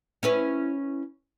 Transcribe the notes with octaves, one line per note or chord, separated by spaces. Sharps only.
C#4 E4 B4